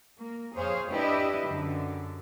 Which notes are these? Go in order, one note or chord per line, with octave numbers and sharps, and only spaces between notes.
A#3
F2 G#4 C5 C#5 F5
D4 E4 G4 B4 D#5 E5
F#2 D3